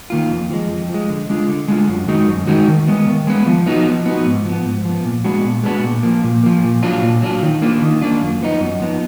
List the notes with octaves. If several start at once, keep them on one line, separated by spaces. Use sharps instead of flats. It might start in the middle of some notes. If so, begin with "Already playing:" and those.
D#3 A#3 F4
F2
F3 G#3
F2
F3 G#3
D3
G#3 D4 F4
D3
G#3 D4 F4
F#2
D#3 G#3 D#4 F#4
F#2
D#3 G#3 D#4 F#4
D#3
G#3 B3
D#3
G#3 B3
F3
B3 D#4 F#4
F3
B3 D#4 F#4
G#2
F3 B3
G#2
F3 B3
A#2
G#3 B3 D4 F#4
A#2
G#3 B3 D4 F#4
A#2
F3 A#3
A#2
F3 A#3
A#2
F#3 D4 F4
A#2
F#3 D4 F4
D#3
A#3 D4 F4
D#3
A#3 D4 F4
F#2
F3 B3 D#4
F#2
F3 B3 D#4